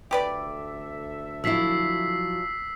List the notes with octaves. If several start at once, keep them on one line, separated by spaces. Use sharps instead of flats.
D2 G4 A4 B4 D5 E5
F3 F#3 E4 E6 B6 C7